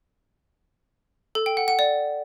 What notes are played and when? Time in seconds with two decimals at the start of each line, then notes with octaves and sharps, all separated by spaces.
1.35 A4
1.46 G5
1.57 F#5
1.68 F#5
1.79 D5